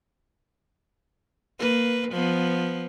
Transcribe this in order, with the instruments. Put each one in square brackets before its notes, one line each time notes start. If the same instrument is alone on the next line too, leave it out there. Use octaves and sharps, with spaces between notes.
[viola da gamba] A#3 B4
F3 B3